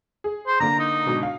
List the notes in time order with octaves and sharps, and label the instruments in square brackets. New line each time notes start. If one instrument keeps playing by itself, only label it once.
[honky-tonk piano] G#4
[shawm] C5
[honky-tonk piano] D3 A#3 [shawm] A#5
[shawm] D#4
[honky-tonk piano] G#2 B2 D3
F5